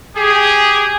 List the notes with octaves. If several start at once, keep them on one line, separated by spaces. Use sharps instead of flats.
G4 G#4